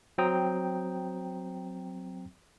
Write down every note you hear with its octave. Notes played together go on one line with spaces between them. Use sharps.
F#3 C4 G5 A#5 D#6